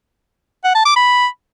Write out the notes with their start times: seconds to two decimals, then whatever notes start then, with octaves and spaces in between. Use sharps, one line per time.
0.64 F#5
0.75 A5
0.86 D6
0.96 B5